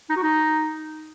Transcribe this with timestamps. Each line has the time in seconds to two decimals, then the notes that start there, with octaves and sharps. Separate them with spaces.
0.10 D#4
0.16 F#4
0.23 D#4